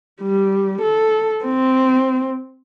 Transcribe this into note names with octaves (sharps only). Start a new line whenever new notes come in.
G3
A4
C4